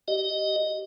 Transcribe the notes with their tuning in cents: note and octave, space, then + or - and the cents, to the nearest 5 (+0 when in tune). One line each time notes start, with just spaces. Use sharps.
G4 -25 D#5 +0